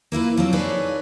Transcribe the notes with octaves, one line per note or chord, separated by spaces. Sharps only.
A#3 E4 F4 B4
F3 F#3 C4
D4 D#4 G#4 A#4 B4 C#5